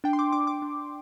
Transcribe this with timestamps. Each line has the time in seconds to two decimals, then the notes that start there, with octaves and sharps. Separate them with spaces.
0.04 D4 G5
0.13 C6
0.19 D6
0.33 D4 D6
0.47 D6
0.62 D4